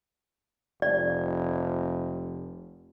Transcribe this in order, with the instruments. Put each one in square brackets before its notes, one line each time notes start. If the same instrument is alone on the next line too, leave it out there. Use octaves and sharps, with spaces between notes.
[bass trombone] F1 [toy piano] D5